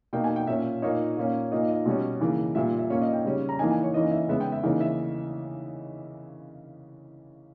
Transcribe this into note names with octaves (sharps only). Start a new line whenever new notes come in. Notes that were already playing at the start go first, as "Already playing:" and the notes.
B2 A#3 D#4 G5
G#5
G5
A#2 A#3 C#4 E5
A#2 A#3 D#4 C#5
A#2 A#3 C#4
A#2 A#3 D#4 D#5
D#5
B2 G3 C#4
C#3 E3 A#3
A#2 G3 A#3 E5
E5
A#2 A#3 C#4 C#5
D#5
G5
C#3 G3 C#4
A#5
E3 A#3 D#4 G#5
G#5
C#5
E3 A#3 C#4 D#5
E5
C#3 G#3 B3 E5
G5
E5
C#3 E3 A#3 D#4
E5